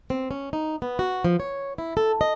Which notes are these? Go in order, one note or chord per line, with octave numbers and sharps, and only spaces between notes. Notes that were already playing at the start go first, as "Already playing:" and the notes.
C4
C#4
D#4
B3
F#4
F3
C#5
E4
A4
D#5